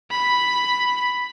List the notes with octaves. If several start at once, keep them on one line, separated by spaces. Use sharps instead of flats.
B5